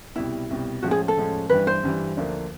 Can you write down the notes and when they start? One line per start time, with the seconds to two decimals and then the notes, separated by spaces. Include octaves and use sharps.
0.16 C2 B2 G3 E4
0.50 C2 B2 G3
0.82 A2 F3 G#3 C#4 F#4
0.91 G#4
1.08 A4
1.17 A2 F3 G#3 C#4
1.50 G2 E3 G3 B4
1.67 C5
1.83 G2 E3 G3
2.17 D2 D3 F3 A#3 D4